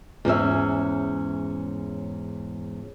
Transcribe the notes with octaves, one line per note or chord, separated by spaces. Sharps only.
E2 G#2 C#4 E5